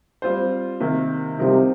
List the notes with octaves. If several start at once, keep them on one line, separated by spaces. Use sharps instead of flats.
G3 C4 F4 C5
C3 D#3 A#3
C2 C3 F3 D#4 A#4